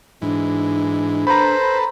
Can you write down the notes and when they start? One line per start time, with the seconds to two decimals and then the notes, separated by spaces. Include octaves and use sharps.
0.22 G#2 E3 D4
1.27 A4 B4 C5 A#5 B5